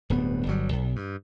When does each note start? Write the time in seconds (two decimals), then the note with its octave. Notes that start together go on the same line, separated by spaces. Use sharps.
0.10 D1 G2 B3
0.47 G1 F#3 G3
0.73 B1
0.96 G2